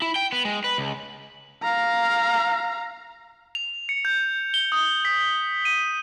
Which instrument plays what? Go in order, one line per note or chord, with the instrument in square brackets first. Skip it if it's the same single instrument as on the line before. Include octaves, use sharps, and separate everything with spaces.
[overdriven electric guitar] E4
G5
B3
G#3
B4
C#2
[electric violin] F5 A#5
[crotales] F7
C#7
G6
G7
D#6
B6
D#7